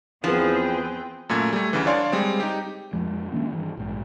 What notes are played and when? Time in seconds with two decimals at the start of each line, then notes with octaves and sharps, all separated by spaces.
0.24 E2 E3 F3 B3 C4 G#4 B4 G5
1.29 F#2 A#2 A3 G#6
1.53 G3 A3
1.73 D2 C#3 E3
1.86 D4 C#5 D5 F5 C6
2.12 G3 G#3 C4
2.40 D#4 G4
2.93 F2 F3 G#3
3.32 D#3 A#3 C#4 D4
3.52 G2 E3
3.77 A#1 G#2